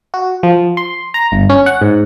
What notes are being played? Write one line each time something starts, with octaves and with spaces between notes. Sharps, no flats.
F#4
F3
C6
A#5
G1
C#4
F#5
G#2